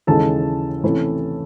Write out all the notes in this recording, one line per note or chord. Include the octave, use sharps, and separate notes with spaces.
D#2 C#3 E3 G#3 A4 A5
C3 E3 A3 C#4 E4